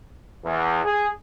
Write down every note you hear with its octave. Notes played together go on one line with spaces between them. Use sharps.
E2
G#4